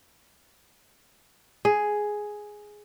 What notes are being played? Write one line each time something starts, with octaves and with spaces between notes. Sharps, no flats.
G#4